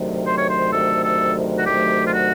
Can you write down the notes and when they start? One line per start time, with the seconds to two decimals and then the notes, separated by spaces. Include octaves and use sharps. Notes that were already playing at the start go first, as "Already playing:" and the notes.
Already playing: D2 C3 D#3 F#3 A3
0.25 C5
0.38 C#5
0.49 C5
0.72 D2 C3 D#3 F#3 A3 A4
1.04 A4
1.58 F#4
1.66 D2 C3 D#3 F#3 A3 G4
2.06 F4
2.14 F#4